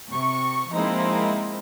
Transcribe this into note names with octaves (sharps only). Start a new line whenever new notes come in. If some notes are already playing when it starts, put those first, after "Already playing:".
C3 C#6
F3 G#3 A#3 C4 D#4 E4